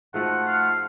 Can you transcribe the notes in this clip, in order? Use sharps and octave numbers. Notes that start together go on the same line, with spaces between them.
G#2 F3 A3 F4 F#4 F#5
F5